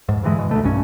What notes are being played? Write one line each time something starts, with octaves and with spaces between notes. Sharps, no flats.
G#2
G2 D3 E3 G#3
B2
D2 A3
B1 G2 C#4